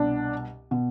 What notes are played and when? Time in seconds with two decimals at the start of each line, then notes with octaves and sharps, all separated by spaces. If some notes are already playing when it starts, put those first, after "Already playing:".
Already playing: C2 B2 D4
0.71 B2